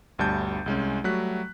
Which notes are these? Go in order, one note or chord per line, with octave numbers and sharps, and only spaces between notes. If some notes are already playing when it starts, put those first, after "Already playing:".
G1 D2 G3 A5 G6
C2 G#3 C#4
F#3 G3 A3 F#4 F#6 B6